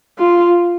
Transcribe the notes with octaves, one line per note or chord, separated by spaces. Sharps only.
F4